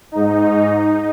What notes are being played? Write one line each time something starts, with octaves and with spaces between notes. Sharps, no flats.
G#2 D#4
D#4